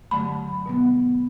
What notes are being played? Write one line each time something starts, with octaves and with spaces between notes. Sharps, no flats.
G2 D3 F#3 A3 B5
B2 G3 B3